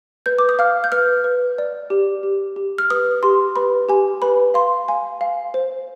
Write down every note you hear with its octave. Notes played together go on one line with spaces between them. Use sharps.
B4 G6
D6
D#6
F5 F6
G6
B4 F6
B4
D5
G4
G4
G4
F6
B4 D#6
G4 C6
B4 B5
G4 G#5
B4 B5
F5 C6
F5 G#5
F5
C5